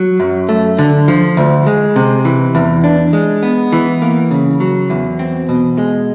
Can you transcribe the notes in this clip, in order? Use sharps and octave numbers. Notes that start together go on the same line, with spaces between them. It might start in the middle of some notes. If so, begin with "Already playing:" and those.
Already playing: F#3
F#2
A3
D3
F3
D2
G#3
C3
E3
E2
D4
G#3
B3
E3
A#3
C#3
F#3
E2
C4
B2
G#3